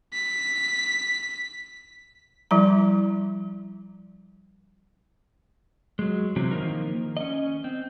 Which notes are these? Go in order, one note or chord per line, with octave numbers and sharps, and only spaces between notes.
B6
F3 G3 E4 A#5
F#3 G#3
C3 E3 F#3 C4
D#3 F3 A#3 D#4 A#4
C#4 D#5
C4